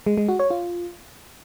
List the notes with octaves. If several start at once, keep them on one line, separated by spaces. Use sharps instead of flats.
G#3
G#3
F#4
C#5
F4